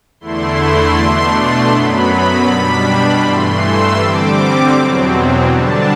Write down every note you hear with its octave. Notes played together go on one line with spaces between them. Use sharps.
E2 D3 A3 E4 C6
B2 A3 D4
F#2 F#3 B3 B5
B2 G3 D4
G2 E3 A3 C6
E6
D3 G3 C4 D6
E2 B2 F#3 C4
D3 G3 D4 A5